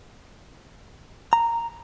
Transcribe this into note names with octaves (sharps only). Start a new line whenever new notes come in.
A#5